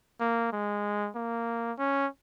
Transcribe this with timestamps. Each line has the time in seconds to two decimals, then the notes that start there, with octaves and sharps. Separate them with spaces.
0.20 A#3
0.53 G#3
1.16 A#3
1.79 C#4